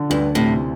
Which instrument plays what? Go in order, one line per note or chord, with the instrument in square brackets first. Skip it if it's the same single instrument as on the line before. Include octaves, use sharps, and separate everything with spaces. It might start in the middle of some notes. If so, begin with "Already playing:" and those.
Already playing: [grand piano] D3
[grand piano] D2 [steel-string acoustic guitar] G2
[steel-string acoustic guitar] A2 [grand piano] C3